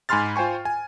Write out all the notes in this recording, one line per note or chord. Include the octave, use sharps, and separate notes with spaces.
G#2 G#5 B5 C6 F6 A6
F4 C5 G5 G#5 C#6
G#5